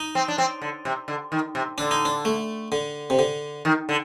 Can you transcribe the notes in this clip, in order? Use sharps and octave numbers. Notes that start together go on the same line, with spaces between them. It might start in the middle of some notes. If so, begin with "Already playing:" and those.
Already playing: D#4
C4
D4
C4
D3
C3
D3
D#3
C3
D3 D4
D#4
D4
A3
D3
C3
D3
D#3
D3